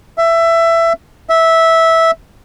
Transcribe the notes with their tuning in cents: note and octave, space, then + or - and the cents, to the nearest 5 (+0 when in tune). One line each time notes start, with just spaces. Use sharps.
E5 +15
E5 -10